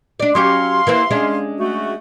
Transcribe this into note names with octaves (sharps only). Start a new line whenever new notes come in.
D4 D5
F#3 C#4 G4 F5 C6
E3 A#3 C4
G#3 C#4 D4
A3 F#4